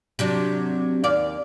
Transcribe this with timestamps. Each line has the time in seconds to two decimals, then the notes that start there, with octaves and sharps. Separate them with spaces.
0.19 C3 F#3 D4
1.04 D#2 D5 F5